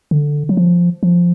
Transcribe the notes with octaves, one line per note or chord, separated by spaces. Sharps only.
D3
F#3
F3
F3